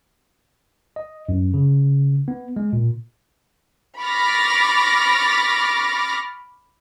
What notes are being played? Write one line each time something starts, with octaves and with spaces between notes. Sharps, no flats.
D#5
F#2
C#3
B3
G#3
A#2
B5 C#6 D6 F6 A6 A#6